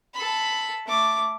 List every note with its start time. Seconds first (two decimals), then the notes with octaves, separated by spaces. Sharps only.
0.14 A4 B5
0.86 A3 D6